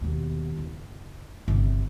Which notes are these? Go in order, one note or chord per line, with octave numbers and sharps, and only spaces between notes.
D#2 B2
F#1
G1 C3